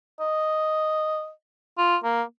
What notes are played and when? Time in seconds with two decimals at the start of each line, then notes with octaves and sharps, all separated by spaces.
0.20 D#5
1.78 F4
2.04 A#3